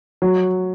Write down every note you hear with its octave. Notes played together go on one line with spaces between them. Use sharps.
F#3